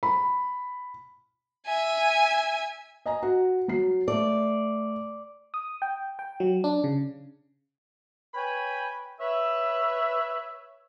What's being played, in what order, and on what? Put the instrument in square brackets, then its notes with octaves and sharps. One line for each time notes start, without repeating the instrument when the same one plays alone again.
[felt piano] B5
[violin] E5 G#5
[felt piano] D#5 G#5 A#5
F#4
F#3 C7
[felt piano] A3 [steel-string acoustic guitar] D5
[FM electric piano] D#6
G5
G5
F#3
D4
C#3
[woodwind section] B4 C#5 G5 G#5 B5
B4 C#5 E5